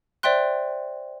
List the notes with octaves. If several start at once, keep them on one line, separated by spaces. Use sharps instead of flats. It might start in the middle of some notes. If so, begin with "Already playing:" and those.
C5 D5 E5 G5 C6 F#6